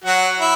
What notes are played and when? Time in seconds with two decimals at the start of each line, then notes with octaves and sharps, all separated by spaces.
0.04 F#3 F#4
0.41 E4